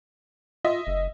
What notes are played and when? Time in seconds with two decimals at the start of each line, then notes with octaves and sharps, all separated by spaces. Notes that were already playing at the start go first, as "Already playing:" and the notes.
0.65 F4 D#5 E5
0.87 F#1